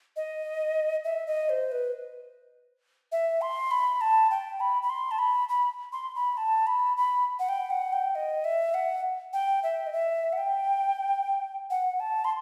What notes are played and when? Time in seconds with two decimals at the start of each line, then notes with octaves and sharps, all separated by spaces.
0.16 D#5
1.04 E5
1.27 D#5
1.49 C5
1.72 B4
3.12 E5
3.42 C6
3.71 B5
4.01 A5
4.31 G5
4.60 B5
4.82 B5
4.90 C6
5.11 A5
5.19 B5
5.49 B5
5.92 C6
6.15 B5
6.37 A5
6.67 B5
6.97 B5
7.39 F#5
7.49 G5
7.70 F#5
7.93 G5
8.15 D#5
8.44 E5
8.74 F#5
9.33 G5
9.63 E5
9.87 D#5
9.93 E5
10.33 F#5
10.37 G5
11.70 F#5
12.00 A5
12.25 C6